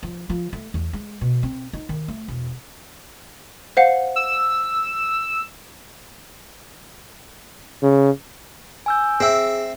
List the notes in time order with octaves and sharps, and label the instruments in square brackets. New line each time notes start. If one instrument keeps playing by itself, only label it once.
[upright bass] F3
F3
A3
E2
G#3
B2
C4
D#4
D#3
A3
E1
[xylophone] C5 F5 F#5
[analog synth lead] E6
[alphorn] C#3
[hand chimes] G#5 E6 G6
[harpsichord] C4 E5 [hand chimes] G#4